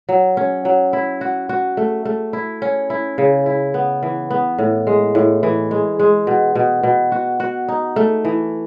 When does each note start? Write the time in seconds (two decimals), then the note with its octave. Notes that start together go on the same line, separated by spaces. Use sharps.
0.09 F#3
0.37 C#4
0.65 F#3
0.93 E4
1.21 F#4
1.49 F#4
1.77 A3
2.05 A3
2.33 E4
2.62 C#4
2.90 E4
3.18 C#3
3.46 E4
3.74 B3
4.03 E3
4.31 B3
4.58 A2
4.87 G#3
5.15 A2
5.43 E3
5.71 G#3
5.99 G#3
6.27 B2
6.55 B2
6.83 B2
7.12 F#4
7.40 F#4
7.68 D#4
7.96 A3
8.25 E3